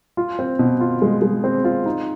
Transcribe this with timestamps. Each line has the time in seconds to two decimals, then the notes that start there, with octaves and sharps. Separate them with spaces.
0.17 F4
0.39 C4
0.59 B2
0.80 F4
1.02 G#3
1.22 G#3
1.44 C4
1.65 F4
1.86 D#4